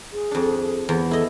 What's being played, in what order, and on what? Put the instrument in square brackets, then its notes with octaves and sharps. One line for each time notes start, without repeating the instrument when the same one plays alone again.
[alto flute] G#4
[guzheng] F2 D4
E2
[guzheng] E4 D#5 [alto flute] A4